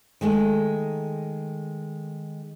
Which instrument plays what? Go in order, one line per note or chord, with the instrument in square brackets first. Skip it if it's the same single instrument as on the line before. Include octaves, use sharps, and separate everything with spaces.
[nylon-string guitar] D#3 G#3 A3